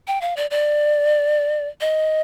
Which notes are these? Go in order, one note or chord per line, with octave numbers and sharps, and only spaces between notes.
G5
F5
D5
D5
D#5